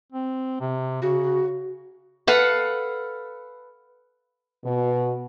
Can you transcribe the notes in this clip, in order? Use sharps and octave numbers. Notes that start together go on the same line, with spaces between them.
C4
C3
C#3 F#4
A4 B4 F5 F#5
B2